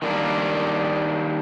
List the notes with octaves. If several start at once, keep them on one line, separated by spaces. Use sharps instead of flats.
D#3 G3 A#3 D4